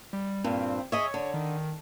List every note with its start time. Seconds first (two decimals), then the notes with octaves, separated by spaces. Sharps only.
0.13 G3
0.44 G2 A#2 C4
0.92 G#4 C#5 D#5 E5
1.14 D3
1.34 D#3